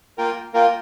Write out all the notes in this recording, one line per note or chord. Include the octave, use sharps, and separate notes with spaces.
A#3 F4 A#4 G5
A#3 F4 A#4 G5